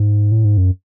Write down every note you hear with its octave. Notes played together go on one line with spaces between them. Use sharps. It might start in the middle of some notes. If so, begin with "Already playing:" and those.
Already playing: G#2
A2
G#2
F#2